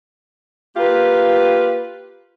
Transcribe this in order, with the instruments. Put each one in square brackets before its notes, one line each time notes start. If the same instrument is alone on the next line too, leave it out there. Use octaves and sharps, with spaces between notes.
[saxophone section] A#3 F4 G4 B4